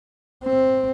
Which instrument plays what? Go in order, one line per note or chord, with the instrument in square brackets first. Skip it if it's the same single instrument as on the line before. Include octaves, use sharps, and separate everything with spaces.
[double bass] C4